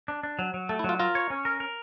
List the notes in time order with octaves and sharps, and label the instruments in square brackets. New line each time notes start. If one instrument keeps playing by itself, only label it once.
[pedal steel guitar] D4
D4
F#3
F#3
[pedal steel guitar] A3 [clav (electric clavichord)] A4
[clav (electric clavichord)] E4
[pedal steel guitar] F#3 [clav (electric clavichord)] F4
[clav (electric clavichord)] F4 [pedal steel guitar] A#4
[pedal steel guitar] C#5
C#4
A#4
A#4